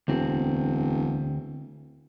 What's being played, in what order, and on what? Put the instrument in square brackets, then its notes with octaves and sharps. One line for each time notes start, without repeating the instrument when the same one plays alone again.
[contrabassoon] E1 [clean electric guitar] D2 C4